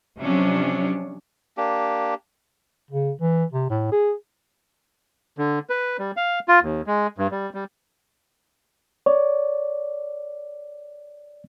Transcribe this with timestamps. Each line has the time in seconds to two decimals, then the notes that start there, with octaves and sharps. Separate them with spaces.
0.20 C3 F3 F#3 C#4 D4
1.57 A#3 D4 G4
2.90 C#3
3.21 E3
3.53 C3
3.70 A2
3.92 G#4
5.38 D3
5.70 B4
5.99 G3
6.17 F5
6.48 F4
6.62 D#2
6.87 G#3
7.18 G2
7.31 G3
7.54 G3
9.06 C#5 D5